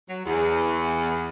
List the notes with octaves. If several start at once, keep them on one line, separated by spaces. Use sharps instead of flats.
F#3
E2